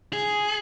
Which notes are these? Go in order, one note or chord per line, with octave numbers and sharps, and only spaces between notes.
G#4